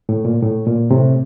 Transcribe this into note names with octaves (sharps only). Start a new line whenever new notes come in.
A2
A#2
A2
A#2
A2 C3